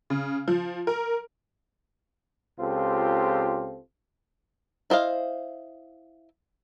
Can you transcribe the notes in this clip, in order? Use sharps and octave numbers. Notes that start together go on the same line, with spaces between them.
C#3
F3
A#4
C#2 C4 F4 G4 A4
E4 C5 D#5 F5